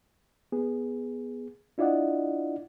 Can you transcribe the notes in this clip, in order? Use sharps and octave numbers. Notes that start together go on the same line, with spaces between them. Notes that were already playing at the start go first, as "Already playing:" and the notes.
B3 G#4
D4 E4 F4 D5 D#5 F#5